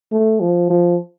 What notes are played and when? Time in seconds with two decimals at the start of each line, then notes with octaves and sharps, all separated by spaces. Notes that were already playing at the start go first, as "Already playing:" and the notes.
0.12 A3
0.41 F3
0.70 F3